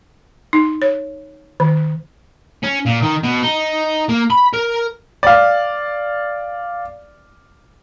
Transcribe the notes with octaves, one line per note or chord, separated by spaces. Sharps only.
D#4
C#5
D#3
C#4
A#2
D#3
B2
D#4
A#3
B5
A#4
D5 F5